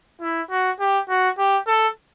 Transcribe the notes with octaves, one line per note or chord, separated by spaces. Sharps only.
E4
F#4
G4
F#4
G4
A4